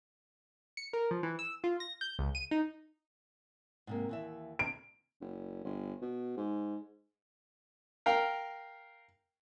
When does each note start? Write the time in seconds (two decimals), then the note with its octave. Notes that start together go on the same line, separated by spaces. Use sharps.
0.77 C#7
0.93 A#4
1.11 F3
1.23 E3
1.39 E6
1.64 F4
1.80 A#6
2.01 G6
2.19 C#2
2.35 D#7
2.51 D#4
3.87 G#2 C3 A#3
4.09 D#2 E3 E5
4.59 C3 D7
5.21 F#1
5.65 G1
6.02 B2
6.37 G#2
8.06 A#4 F5 G5